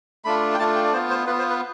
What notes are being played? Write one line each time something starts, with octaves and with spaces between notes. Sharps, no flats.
A3 D4 F4 B5
G5
A3 D4 F4 A5
G5
D5
B3 F4 C5
C5
B3 F4 B4
C5
B4